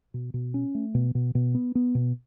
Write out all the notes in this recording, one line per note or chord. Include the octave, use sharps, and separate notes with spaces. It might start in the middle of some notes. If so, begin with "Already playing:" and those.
B2
B2
C#4
A3
B2
B2
B2
B3
B3
B2